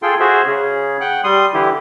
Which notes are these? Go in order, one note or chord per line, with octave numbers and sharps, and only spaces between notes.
F4 G#4 A4 G5 C6
F#4 G#4 C5 E5
C#3 C#4 G#4
F#5 G5 F#6
G3 C6 D#6
D3 E3 E4 G4